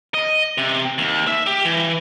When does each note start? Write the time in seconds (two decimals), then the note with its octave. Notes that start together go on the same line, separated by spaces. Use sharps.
0.14 D#5
0.58 C3
0.98 D#2
1.27 E5
1.47 G4
1.65 E3